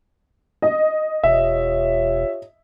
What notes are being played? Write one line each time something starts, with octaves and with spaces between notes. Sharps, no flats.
D#5
E1 F4 G4 C#5 E5